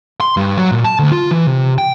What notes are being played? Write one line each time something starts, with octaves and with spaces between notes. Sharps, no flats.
C6
G2
F#3
A#2
A5
D2
F4
E3
C3
G5